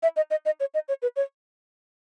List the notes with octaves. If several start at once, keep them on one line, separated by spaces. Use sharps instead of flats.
E5
D#5
D#5
D#5
C#5
D#5
C#5
B4
C#5